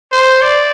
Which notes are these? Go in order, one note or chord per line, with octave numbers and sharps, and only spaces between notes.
C5
D5